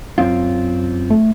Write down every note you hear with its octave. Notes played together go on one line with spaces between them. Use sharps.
F#2 C4 F4
A3